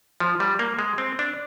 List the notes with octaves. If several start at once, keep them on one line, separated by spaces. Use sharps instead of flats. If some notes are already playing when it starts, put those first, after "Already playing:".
F3
G3
A#3
G#3
C4
D4